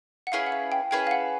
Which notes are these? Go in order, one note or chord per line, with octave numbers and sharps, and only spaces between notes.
F#5
C#4 E4 G#4 B4 F5
F#5
F5
G5
C#4 E4 G#4 B4 G5
F5
F#5